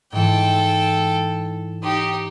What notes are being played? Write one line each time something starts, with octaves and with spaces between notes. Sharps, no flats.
G#2 E3 A4 G5
D#4 G4